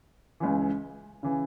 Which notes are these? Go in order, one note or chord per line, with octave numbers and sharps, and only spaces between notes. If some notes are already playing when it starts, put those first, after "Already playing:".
C#2 C#3 E3
C#3 E3